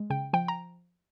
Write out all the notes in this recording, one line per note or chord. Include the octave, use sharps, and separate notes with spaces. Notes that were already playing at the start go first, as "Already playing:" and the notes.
Already playing: G#3
C#3 G5
F3 G5
A#5